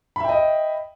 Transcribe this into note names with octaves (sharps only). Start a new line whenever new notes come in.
D#5 E5 G5 B5